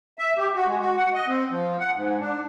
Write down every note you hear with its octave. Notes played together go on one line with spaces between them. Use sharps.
E5
G4
F#4
G#3
F#4
F#5
D#5
C4
F3
F#5
G#2
D4